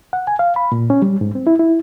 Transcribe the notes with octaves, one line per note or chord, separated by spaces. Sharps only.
F#5
G#5
F5
B5
A#2
C#4
G3
G#2
C4
E4
E4